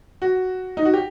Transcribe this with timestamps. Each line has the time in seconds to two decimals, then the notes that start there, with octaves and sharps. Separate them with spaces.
0.22 F#4
0.77 D#4
0.85 F#4
0.94 G4